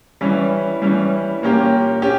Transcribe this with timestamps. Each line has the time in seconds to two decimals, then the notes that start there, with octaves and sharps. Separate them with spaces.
0.21 E3 G3 C#4
0.82 E3 G3 C#4
1.42 A#2 A#3 C#4 G4
2.02 C#4 G4